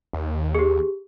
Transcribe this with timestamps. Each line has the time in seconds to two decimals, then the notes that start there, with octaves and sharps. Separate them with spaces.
0.13 D#2
0.55 G4 G#4